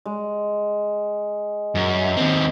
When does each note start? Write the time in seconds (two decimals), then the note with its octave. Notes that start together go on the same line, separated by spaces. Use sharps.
0.06 G#3
1.75 F#2
2.17 D#2 C4